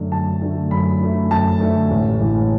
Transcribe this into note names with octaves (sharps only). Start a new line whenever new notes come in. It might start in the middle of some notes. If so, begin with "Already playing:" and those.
Already playing: F#2 D3 A3
F#2 A5
D3 A3
F#2 B5
D3 A3
F#2 A5
D3 A3
A1
A2 E3 G#3